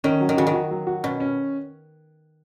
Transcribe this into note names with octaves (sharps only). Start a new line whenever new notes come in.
D#3 C#4
F#3
D#3
C#3 F#4
D#3
F#4
F#3
F#4
B2 C#4
C#4